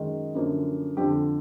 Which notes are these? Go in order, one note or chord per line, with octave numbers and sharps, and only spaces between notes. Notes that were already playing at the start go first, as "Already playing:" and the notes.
Already playing: F#2 D#3 G#3
F#2 D3 F3 A#3
F2 D3 F3 G4